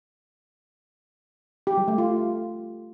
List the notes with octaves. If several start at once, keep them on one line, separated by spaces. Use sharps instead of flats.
G4
G3
A3
F4